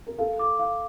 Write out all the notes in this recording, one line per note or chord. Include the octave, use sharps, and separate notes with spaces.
A#4
A4 F5
D6
F5